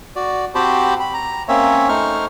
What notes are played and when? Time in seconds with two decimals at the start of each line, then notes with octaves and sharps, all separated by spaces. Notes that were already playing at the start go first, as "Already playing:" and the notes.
0.16 F#4 D5
0.55 C4 F#4 G4 C5 A5 B5
1.00 B5
1.14 A#5
1.48 A#3 C4 C#4 C#5 E5
1.89 A3 D#4 C5 C#6 F6